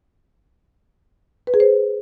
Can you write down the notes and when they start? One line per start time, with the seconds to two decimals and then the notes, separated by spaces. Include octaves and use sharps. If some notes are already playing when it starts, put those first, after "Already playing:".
1.47 B4
1.54 G#4
1.60 C5